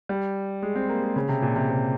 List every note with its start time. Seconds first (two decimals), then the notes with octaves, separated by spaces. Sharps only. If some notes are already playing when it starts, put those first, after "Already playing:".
0.09 G3
0.63 G#3
0.76 C4
0.89 A#3
1.03 G#3
1.16 C#3
1.29 C3
1.42 A#2
1.56 C3
1.69 C3